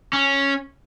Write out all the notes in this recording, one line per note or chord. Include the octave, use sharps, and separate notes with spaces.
C#4